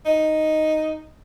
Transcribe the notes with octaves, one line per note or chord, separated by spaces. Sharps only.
D#4